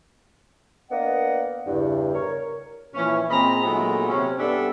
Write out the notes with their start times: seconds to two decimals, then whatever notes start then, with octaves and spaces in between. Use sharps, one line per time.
0.90 A#3 B3 D4 A#4 D#5 F#5
1.66 E2 G2 C#3
2.14 A#4 C#5
2.95 A#2 E3 F3 C#4
3.30 A#2 C4 G#4 D#5 A#5 B5
3.64 A#2 D#3 F#3 G#3 A3 B3
4.08 C3 C4 C#4
4.38 G2 G3 B3 D4 A4 E5